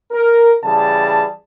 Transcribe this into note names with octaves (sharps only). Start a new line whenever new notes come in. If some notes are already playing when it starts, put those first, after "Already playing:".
A#4
C#3 E3 G3 G#4 A5